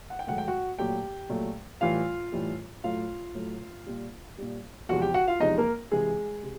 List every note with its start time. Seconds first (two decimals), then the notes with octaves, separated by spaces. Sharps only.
0.10 F#5
0.19 G5
0.27 G#2 D#3 F#3 A3 F#5
0.38 G5
0.48 F#4 F#5
0.79 A#2 F#3 A3 G4 G5
1.29 A#2 F#3 A3
1.81 A2 E3 G3 F4 F5
2.32 A2 E3 G3
2.84 A2 F#3 A3 F4 F5
3.35 A2 F#3 A3
3.86 A#2 G3
4.38 A#2 G3
4.89 E2 C3 F3 G#3 F#4 F#5
5.01 G4 G5
5.14 F#4 F#5
5.28 F4 F5
5.40 E2 C3 F3 G#3 D#4 D#5
5.58 A#3 A#4
5.91 C3 E3 G#3 G#4
6.43 C3